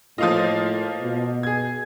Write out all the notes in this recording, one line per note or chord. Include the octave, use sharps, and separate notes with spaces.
A2 F3 A#3 F4 D#5 D#6
B2
G#4 G#6